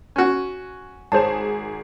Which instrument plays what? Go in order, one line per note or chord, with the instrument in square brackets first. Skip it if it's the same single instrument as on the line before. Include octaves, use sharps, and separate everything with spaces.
[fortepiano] C#4 F#4
[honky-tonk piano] G#1 G#4 E7 [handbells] C5 C#5 A5